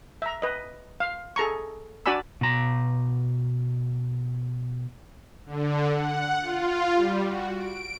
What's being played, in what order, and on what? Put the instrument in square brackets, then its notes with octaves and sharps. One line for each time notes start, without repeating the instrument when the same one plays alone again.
[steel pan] E5 A#5
B4 D#5
F5
G#4 A4 A#5 C#6
D4 F#4 D5 G#5 B5 E6
[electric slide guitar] B2 A#5
[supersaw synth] D3
F#5
F4
G3
F#4
D7